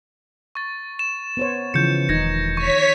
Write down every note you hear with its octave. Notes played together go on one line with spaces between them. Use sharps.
C#6 A6
E7
B3 C5 C#5
C#3 E3 F3 G6 C#7
E1 D#3 D#4 G6 G#6 A#6
C#5 C#6 B6